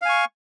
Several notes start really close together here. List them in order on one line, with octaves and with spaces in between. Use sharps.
F5 G#5 C#6